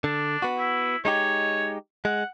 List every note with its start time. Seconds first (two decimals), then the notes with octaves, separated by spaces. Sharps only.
0.04 D3 D4
0.42 B3 F#4
0.58 E4
1.05 G#3 D#4 G4 C#5
2.05 G#3 F#5